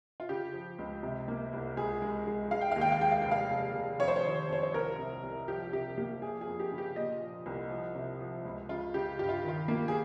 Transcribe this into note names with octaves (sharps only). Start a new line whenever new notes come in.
F4
C#3 G4
F3
C#2
C3
A#3
C2
C#2 G#4
G#3
G#3
G#3 F5
G5
D#2 F5
G5
F5
G#3 G5
F5
F1 G5
F5
F1
F1
F2 C#5
C5
C#5
D#3
F2 C#5
C5
C2 A#4
C3
C2
F3 G4
C3 G4
A#3 G4
F3 G#4
G#4
F2
G4
C#3
G4
A#2 D#5
F3
C2
F3
C3
F3
C#2
C#3 F4
C#3 G4
G2 G4
F4
D#3 F4
A#3
G#4